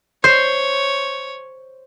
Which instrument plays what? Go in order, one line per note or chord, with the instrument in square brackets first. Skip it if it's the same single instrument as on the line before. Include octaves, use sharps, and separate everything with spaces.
[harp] C5 [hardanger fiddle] C#5